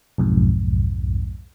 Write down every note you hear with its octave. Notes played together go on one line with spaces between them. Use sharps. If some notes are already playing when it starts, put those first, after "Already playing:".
B1 F2 G#2